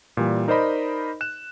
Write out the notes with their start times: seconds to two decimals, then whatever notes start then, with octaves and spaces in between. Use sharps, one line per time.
0.17 A#2 E3 G3
0.48 D#4 A#4 C5 D5 D#5 B5
1.21 F#6 E7